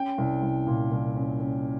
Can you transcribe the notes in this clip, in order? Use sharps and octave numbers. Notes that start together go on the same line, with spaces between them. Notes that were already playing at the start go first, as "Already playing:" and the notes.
Already playing: C#4 G5
C2
C2
A#2
C2
C#4
C#4